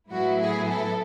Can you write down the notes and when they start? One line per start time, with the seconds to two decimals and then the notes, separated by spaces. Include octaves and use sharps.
0.11 A2 F#3 B3 E4 F#4
0.40 G#4
0.68 A4